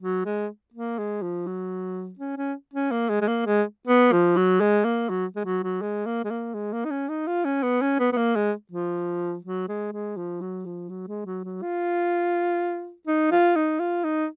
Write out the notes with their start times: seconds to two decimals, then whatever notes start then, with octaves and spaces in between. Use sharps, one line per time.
0.01 F#3
0.25 G#3
0.74 A#3
0.98 G#3
1.22 F3
1.46 F#3
2.19 C#4
2.37 C#4
2.74 C#4
2.91 A#3
3.09 G#3
3.22 G#3
3.28 A#3
3.46 G#3
3.87 B3
4.12 F3
4.37 F#3
4.61 G#3
4.85 A#3
5.09 F#3
5.36 G#3
5.45 F#3
5.63 F#3
5.82 G#3
6.06 A#3
6.24 G#3
6.30 A#3
6.54 G#3
6.73 A#3
6.85 D#4
6.91 C#4
7.09 D#4
7.27 F4
7.45 C#4
7.63 B3
7.81 C#4
7.99 B3
8.13 B3
8.17 A#3
8.36 G#3
8.71 F3
9.45 F#3
9.68 G#3
9.93 G#3
10.17 F3
10.41 F#3
10.65 F3
10.89 F#3
11.08 G#3
11.26 F#3
11.44 F#3
11.62 F4
13.07 D#4
13.31 F4
13.56 D#4
13.80 F4
14.04 D#4